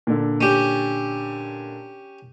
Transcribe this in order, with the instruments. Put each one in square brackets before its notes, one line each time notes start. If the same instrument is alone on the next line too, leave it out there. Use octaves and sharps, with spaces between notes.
[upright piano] A#2 D3
[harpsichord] C#4 G4